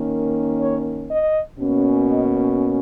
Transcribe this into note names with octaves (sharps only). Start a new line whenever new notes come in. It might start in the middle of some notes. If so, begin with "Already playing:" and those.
Already playing: D#3 A#3 C#4
C#5
D#5
B2 A#3 C#4
D#5